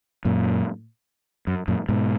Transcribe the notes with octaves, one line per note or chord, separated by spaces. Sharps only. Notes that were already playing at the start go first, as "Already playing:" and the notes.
F#2 A#2
F#2
F#2 A#2
G#2 B2